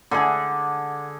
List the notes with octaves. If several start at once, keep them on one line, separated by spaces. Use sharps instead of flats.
D3 G#4